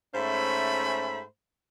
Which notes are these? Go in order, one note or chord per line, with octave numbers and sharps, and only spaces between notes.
G#2 A3 C#4 C5 E5 B5